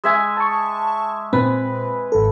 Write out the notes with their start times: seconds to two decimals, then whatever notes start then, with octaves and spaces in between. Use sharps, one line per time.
0.04 G#3 E5 G#5
0.37 A5 C#6
1.33 A#2 C4 B4
2.12 G#1 A4